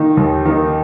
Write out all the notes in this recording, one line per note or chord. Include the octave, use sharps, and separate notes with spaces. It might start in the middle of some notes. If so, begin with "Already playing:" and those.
Already playing: D#3 A#3 D#4
D#2
D#3 A#3 D#4